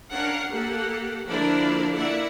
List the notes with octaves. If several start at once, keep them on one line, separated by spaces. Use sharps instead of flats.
C#4 D4 A#4 F5 F#5
A#3 G4 A4 F#5
D3 F3 A#3 D4 E4 A#4
A#3 E4 D5 E5 F#5